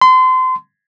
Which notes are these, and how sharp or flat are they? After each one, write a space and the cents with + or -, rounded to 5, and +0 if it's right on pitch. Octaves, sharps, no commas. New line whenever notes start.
C6 -30